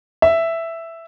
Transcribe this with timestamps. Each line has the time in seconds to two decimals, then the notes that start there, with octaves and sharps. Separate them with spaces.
0.22 E5